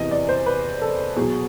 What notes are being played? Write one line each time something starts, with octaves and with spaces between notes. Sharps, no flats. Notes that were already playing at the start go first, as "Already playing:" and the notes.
Already playing: E2 C3 E3 D#5
D5
C5
B4
A4
B2 F#3 G#4